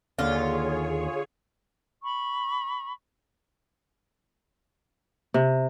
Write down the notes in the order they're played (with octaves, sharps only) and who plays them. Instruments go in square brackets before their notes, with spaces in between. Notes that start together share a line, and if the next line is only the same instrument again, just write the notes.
[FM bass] D#2 [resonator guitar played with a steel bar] D3 [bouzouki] F4 [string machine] G#4 C#5
[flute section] B5 C#6
[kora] C3